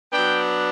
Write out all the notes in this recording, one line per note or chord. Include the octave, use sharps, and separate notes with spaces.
F#3 B3 D4 G5